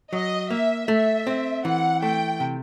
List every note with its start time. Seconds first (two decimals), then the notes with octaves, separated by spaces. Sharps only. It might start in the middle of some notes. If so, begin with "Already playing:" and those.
0.13 F#3 D#5
0.50 A#3 E5
0.88 A3 E5
1.27 C4
1.64 E3 F#5
2.02 A3 G5
2.40 C3